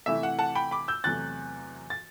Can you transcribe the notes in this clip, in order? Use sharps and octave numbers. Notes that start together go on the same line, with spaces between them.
C3 E3 A3 E4 E5
F#5
F#5 A5
G5 B5
B5 D6
E6 G6
E2 C3 F#3 A3 F#6 A6
A6